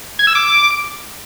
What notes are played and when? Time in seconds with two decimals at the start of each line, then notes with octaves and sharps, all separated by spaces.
0.19 G#6
0.27 E6
0.35 D6